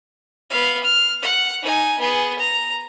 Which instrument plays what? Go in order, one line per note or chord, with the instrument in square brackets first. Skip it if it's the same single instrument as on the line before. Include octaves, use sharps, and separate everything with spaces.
[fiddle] B3 F5
F6
F#5
D#4 G#5
B3 G#4
A#5